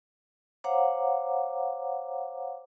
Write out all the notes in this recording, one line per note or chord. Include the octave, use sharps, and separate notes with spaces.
C5 C#5 F5 F#5 A#5 D6